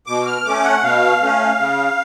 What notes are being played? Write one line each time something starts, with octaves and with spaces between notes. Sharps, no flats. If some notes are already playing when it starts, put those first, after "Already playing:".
B2 D6
F6
A3 C#4 D6
F#5
B2 F5
A3 C#4
C#3